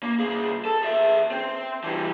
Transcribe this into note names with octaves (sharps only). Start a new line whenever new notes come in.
A#3
C2 G#4
A4
G#4 E5
C4
E3 G3